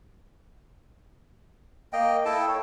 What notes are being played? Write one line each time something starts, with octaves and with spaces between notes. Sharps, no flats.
A#3 D#5 G5
E4 A4 G5 A5
C#5